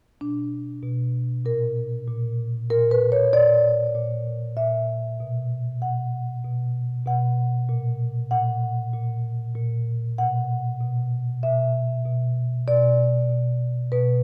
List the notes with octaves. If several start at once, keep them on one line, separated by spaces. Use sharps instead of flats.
B2 D4
B2
A#2 A#4
A#2
A#2 A#4
B4
C#5
A#2 D5
A#2
A#2 E5
B2
B2 F#5
B2
B2 F#5
A#2
A#2 F#5
A#2
A#2
B2 F#5
B2
B2 E5
B2
B2 D5
B2
B2 B4